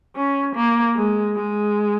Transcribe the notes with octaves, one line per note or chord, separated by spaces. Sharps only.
C#4
A#3
G#3
G#3